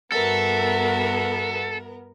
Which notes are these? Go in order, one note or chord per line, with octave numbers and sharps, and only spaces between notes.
G2 B3 F#4 A4 A#4 E5